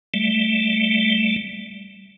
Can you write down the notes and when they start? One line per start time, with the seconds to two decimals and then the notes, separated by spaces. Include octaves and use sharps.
0.14 G3 A3